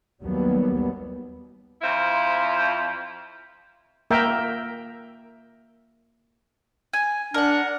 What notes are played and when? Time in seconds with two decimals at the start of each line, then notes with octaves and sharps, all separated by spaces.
0.21 D#2 F#3 G3 B3
1.82 F2 E4 F4 C5
4.11 A#3 A#4 E5 G5
6.93 G#5
7.34 D4 A#4 F#5